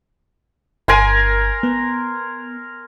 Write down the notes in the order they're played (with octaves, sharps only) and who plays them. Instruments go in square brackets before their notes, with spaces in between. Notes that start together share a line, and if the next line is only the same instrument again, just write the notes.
[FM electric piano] G1 [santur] A#4 G#5 C6
[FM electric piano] B3